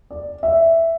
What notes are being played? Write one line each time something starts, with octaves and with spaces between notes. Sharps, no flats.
D5
E5